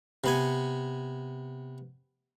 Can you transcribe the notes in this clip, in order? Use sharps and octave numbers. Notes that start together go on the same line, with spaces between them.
C3 B3 G#5